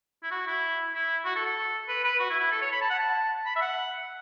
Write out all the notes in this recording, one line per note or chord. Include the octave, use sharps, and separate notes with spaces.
E4
F#4
E4
E4
F#4
A4
A4
B4
B4
F#4
E4
E4
A4
C#5
B5
A5
F#5
A5
B5
E5
F#5